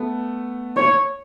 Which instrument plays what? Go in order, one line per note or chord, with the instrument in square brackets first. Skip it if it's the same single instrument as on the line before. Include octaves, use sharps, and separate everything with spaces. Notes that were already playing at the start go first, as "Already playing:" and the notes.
Already playing: [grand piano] A3 B3
[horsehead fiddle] C#5